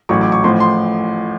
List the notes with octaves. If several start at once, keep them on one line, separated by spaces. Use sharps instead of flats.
A1 A2 F#3 C#6
D6
C#6
A1 A2 F3 C6
C6